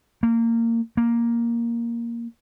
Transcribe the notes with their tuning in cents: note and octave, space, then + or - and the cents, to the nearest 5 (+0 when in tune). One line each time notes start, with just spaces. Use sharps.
A#3 -20
A#3 +5